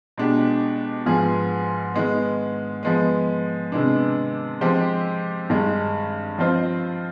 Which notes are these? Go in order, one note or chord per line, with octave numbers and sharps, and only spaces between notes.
B2 G#3 D4 G4
G#2 F3 B3 F4 G#4
D#3 G#3 B3
F3 G#3 B3
C3 D#3 G#3 B3 D4
F3 G#3 C4 G4 C5
G2 D#3 G#3
F3 C4 F4 C5 D#5